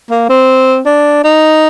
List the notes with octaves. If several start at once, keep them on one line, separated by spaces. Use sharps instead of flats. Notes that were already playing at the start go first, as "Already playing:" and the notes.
A#3
C4
D4
D#4